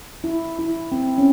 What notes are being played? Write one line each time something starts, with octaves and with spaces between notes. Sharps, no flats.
E4
E4
C4
C#4